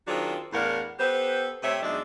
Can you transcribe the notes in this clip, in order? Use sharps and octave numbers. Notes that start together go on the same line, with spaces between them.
D#3 F#3 C4 D4 F4 G#4
E2 A2 D4 A#4 F5 F#5
B3 G4 A4 B4 C5
C3 A3 C4 C#5 E5
E2 F#3 G#3 D4 D#4 E5